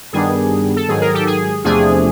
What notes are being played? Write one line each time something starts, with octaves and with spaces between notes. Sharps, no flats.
G2 D#3 G3 B3 D4 G#4
A4
G#2 D#3 F#3 G#4
G#4 A#4
G4 A4
G#4
E2 C3 F3 A3 D4 G#4